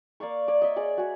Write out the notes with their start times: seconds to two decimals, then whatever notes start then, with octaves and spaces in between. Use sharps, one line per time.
0.20 A#3 D5 F5 C#6
0.48 C#5 D5
0.62 D#5 E5
0.76 G#4 D5
0.98 F#4 G#4